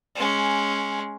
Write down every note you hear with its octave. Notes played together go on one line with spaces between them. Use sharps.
G#3 C#4